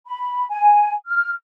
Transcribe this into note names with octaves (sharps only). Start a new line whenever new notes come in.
B5
G#5
F6